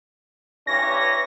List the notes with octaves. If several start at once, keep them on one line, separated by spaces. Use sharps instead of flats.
G2 E3 C#4 A#6